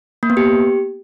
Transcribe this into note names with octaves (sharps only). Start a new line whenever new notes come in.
A#3
B3
G4